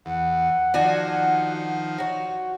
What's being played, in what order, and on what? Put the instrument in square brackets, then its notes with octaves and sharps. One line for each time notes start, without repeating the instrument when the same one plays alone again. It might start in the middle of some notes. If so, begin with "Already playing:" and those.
[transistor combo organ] E2 [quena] F#5
[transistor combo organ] D#3 F3 [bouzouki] D4 F#4 G#5
[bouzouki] F#4 C#5